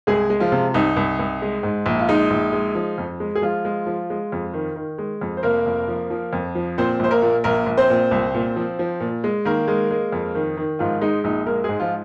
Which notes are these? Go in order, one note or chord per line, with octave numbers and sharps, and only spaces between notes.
C2 G#3 G#4
G#3
F3 F4
C3
C2 D#4
C2
C2
G#3
G#2
A#1
F4
G#3 D#4
A#1
G#3
F3
F2
G#3
G#4
F3 G#3 F4
G#3
F3
G#3
F2
D#3
D#3
G#3
F2
C5
F1 A#3 A#4
F2
F3
F3
F2
F3
A#2 C4 C5
A#1 C5
A#3 A#4
A#2
A#1 A#3 A#4
A#1
C4 C5
A#2
C2
A#2
F3
F3
A#2
G#3
D#3 A#3 A#4
G#3
G#3
F2
D#3
D#3
G#2 F3 F4
G#3 D#4
A#1 D#4
G#3 A#3 A#4
G#2 G#3 G#4
F3 F4